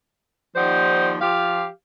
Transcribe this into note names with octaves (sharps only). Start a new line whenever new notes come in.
D#2 F3 G3 D#4 C5 F#5
F3 G4 F5